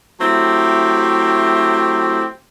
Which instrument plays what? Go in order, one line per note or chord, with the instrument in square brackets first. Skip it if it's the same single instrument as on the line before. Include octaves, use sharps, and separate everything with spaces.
[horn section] F#3 A3 C4 E4 G4